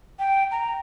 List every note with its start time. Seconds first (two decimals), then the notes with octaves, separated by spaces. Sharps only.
0.19 G5
0.51 A#5